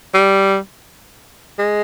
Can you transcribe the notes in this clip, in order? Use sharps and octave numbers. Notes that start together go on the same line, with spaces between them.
G3
G#3